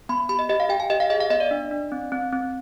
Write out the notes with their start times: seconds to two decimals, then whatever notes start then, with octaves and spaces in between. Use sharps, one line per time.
0.09 B3 B5
0.29 G4 B5
0.39 D#5
0.49 G4 D#5
0.60 F5
0.69 G4 G5
0.80 G#5
0.90 G4 D#5
1.00 F5
1.10 G#4 D#5
1.20 F5
1.30 B3 D#5
1.40 D5
1.51 D4
1.71 D4
1.92 C4
2.12 C4
2.32 C4